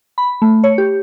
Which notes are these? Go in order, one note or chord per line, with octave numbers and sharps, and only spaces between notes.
B5
A3
C#5
G4